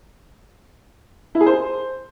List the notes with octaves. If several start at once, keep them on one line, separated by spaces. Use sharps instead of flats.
E4
G#4
C5